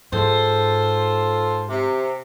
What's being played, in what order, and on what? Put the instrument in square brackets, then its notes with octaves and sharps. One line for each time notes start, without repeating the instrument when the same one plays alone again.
[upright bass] G#2 [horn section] F4 A4 C5
[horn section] C3